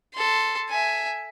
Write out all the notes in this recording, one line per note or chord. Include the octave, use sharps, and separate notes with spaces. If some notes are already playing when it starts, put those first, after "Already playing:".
A4 C6
E5 G#5